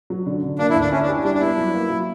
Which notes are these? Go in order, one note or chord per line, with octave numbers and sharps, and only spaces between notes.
F#3
D3
D3
A#3 D4
E4
D2
D4
C#4 E4
D4
G4
G3 D4
D4
B3 E4
F#3
A#3
F#3